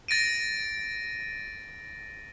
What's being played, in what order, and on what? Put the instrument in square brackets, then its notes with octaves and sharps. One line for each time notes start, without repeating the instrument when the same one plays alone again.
[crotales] A6 A#6 D7 D#7